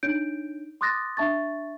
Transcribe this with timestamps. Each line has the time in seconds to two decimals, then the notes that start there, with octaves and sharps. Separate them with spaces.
0.03 D4 D#4 C#5 G6 D7
0.81 C6 D6 D#6 F#6 A6 A#6
1.17 D4 E5 A5 C#6 A6